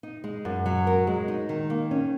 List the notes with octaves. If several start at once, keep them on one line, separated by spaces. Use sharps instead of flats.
D#4
G#3
F#2
F#3
A#4
G#3
D#4
D#3
A#3
C#4